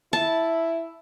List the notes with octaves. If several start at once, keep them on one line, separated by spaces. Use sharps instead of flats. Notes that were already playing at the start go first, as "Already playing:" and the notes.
E4 A5